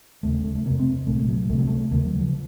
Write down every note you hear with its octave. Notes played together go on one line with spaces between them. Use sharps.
D#2 C#3 A3
A3
A3
A3
F2 C3 A#3
C4
C2 A#2 A3
A3
F#3
C2 C3 A3
F#3
A3
D#2 C#3 A#3
F#3
F3